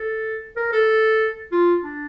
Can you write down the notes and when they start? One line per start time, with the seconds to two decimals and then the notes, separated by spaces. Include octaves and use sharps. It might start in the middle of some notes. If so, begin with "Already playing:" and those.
Already playing: A4
0.56 A#4
0.72 A4
1.52 F4
1.83 D4